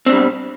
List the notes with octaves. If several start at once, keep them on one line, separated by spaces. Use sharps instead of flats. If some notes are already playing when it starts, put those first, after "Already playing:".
B2 G3 C4 D4